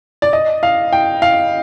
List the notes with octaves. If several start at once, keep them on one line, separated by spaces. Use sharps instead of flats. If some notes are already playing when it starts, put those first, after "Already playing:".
D5
D#5
F5
G5
F5